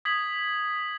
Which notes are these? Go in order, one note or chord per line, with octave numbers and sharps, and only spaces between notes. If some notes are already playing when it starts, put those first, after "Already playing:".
D#6 G#6 B6 F#7